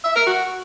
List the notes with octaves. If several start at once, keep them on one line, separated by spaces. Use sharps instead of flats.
E5
A#4
F#4